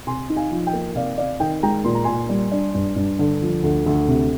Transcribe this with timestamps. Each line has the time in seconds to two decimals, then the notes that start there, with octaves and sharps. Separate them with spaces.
0.07 C3 G#5 C6
0.30 D#4
0.36 F5 G#5
0.51 F3
0.67 D#5 G5
0.73 A#3
0.95 C3 D5 F5
1.18 C4 D5 F5
1.40 D#3 D#5 G5
1.63 G#3 G5 A#5
1.85 A#2 C6
1.95 A#5
2.04 A#2 G#5 C6
2.29 G3
2.51 D4
2.74 G2
2.96 G2
3.19 D3
3.42 F3
3.63 D2
3.86 D2
4.08 C3